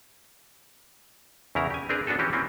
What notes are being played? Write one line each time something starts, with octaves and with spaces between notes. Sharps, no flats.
E2 C#3 E4 A#4 A#5
G4 G#5
C4 D4 G#4 A#4 B4
B3 D4 F#4 G#4 A4
E3 C4 C#4 F#4 G4
E3 A#3 C4 C#4